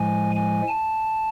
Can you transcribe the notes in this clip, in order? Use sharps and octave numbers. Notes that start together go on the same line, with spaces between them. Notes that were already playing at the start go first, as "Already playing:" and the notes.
Already playing: A2 F3 G#3 G#5
G#5
A5